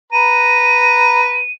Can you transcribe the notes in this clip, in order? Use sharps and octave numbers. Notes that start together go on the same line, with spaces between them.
B4 A#5 D#7